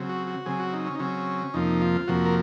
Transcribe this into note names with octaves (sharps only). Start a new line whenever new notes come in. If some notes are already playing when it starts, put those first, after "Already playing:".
Already playing: C#3 F#3 C4
F#4
F#4
C#3 F#3 C4 G#4
F#4
D#4
C#4
D#4
C#3 F#3 C4 C#4
F2 C3 F3 A#3 D#4
F4
F2 C3 F3 A#3 F#4
A#4